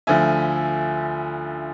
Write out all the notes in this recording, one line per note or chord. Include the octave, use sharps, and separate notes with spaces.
D2 D3 F3 A3 E5 G#5